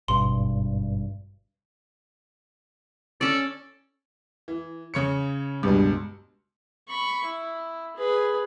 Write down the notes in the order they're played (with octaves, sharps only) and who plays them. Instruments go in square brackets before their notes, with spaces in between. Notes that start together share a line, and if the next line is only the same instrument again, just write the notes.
[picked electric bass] G#1 G2 [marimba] B2 [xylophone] C6
[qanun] C#4 D5 [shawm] A4
[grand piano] E3
C#3 C#5 C#7
[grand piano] C#2 B2 [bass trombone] G2
[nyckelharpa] B5 C#6
E4
G#4 B4